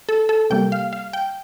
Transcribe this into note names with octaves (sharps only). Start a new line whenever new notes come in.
A4
A4
C3 G3 A#3 G5
F5
F5
G5